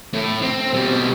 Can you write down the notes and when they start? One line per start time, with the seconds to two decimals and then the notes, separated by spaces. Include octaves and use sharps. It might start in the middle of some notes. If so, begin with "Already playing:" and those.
0.14 A2
0.42 C4
0.74 B2 G3